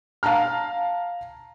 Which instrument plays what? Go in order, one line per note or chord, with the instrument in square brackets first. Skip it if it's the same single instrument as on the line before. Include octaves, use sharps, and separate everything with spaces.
[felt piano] F5 A5 A#5 F6